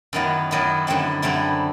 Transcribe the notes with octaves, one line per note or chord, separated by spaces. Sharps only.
F#2 D#3 F#3 B3 E4
F#2 D#3 F#3 B3 E4
F#2 D3 G3 C4 E4
F#2 D3 G3 C4 E4